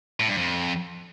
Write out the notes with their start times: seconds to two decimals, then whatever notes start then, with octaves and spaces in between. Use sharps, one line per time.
0.20 A2
0.28 G2
0.37 F2